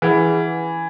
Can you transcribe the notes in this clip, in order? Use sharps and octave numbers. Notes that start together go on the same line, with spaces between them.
E3 G#4 B4 F#5